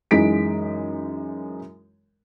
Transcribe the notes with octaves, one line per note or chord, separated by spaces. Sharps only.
F#2 E3 G#3 D#4 B6 D7